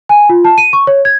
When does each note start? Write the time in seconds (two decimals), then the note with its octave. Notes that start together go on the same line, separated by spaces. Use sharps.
0.09 G#5
0.29 F4
0.45 A5
0.58 D#7
0.73 C#6
0.87 C#5
1.05 G#6